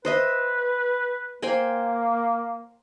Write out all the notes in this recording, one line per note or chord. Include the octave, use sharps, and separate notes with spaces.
B4 C5 D#5 E5
A#3 C5 G5 G#5